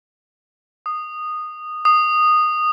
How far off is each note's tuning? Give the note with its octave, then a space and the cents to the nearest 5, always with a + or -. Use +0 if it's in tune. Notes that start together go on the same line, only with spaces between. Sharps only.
D#6 -15
D#6 -15